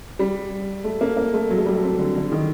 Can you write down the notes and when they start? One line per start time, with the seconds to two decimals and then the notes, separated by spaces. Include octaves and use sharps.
0.19 G3
0.84 A3
1.01 A#3
1.17 A#3
1.34 A3
1.50 F#3
1.58 A3
1.66 G3
1.75 A3
1.83 C4
1.98 D3
2.16 D3
2.32 D#3